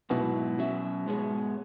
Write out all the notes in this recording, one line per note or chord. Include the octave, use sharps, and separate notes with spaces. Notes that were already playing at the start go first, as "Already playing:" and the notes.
G#2 B2 F#3 E4 B4
F#3 C#4 F#4 E5
G#2 G#3 B3 G#4 C#5